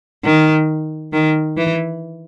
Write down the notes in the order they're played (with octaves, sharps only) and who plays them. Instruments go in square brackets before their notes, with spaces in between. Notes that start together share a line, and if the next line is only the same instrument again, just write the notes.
[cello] D#3
D#3
E3